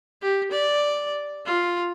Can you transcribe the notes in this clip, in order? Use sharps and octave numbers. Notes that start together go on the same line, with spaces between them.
G4
D5
F4